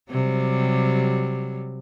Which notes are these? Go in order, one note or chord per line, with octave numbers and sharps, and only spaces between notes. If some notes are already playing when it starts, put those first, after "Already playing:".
C3 F#3 G3